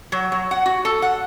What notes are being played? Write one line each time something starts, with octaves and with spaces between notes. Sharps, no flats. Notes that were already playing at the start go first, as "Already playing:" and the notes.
F#3
F#3
F#5
F#4
A4
F#5